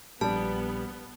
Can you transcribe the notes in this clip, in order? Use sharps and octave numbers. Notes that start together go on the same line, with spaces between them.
A#1 G3 B3 A5